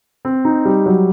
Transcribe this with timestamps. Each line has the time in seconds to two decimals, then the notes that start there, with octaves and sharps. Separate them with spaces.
0.25 C4
0.45 D#4
0.65 G3
0.86 F#3